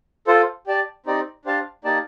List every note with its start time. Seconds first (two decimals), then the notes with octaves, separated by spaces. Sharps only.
0.27 F4 A4 C5
0.67 G4 D5 A5
1.06 C4 D#4 G4 D5
1.45 D4 G4 C5 F5 A5
1.84 A#3 D#4 G4 D5 A5